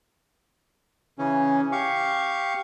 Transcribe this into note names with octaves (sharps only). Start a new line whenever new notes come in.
C#3 E3 C#4
G4 F5 C#6